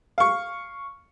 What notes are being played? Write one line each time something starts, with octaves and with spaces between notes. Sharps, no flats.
F5 C#6